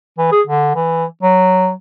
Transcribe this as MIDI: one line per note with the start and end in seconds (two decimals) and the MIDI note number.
0.18 0.28 52
0.32 0.41 68
0.47 0.72 50
0.76 1.05 52
1.23 1.71 54